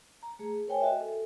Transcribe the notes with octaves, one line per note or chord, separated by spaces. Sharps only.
A#5
A3 G#4
A#4 C5 C#5 G5 G#5
F#4 D#5 E5
A4